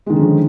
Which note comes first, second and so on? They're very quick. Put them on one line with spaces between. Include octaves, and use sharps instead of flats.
G#3 D#3 D3 C#4 F3